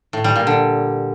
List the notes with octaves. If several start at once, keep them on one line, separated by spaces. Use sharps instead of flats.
A2
G3
A#2
D3